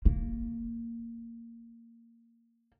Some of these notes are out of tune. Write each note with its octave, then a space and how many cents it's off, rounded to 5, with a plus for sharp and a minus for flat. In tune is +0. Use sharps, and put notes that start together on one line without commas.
A#3 -10